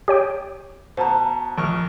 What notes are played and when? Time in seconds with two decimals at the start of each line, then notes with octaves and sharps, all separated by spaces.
0.08 G4 C#5 G5
0.97 B2 C5 A5 A#5
1.58 A#1 C#6 F6